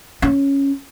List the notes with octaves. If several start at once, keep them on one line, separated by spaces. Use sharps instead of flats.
C#4